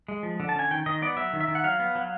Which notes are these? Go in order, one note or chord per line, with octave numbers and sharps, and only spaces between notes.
G#3
F3
D3
A5
C#4 G#5
D#3 G5
D#3 D#5
B3 D5
F#3 E5
D#3
E5
D#3
F#5
F#3 F5
B3
F#3